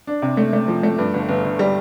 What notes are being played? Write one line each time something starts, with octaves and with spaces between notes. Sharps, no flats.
D4
C3
A3
A3
F3
A3
G2
G1
G1
G1
G3